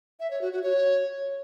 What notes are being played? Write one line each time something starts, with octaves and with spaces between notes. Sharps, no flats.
E5
C#5
F#4
F#4
C#5